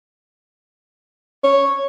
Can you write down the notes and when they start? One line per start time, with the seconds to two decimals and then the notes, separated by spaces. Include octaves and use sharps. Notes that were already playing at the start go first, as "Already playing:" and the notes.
1.44 C#5